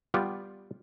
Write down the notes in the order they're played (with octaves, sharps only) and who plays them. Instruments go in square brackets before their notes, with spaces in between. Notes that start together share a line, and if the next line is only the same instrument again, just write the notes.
[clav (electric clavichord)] G3 B3 F4 D5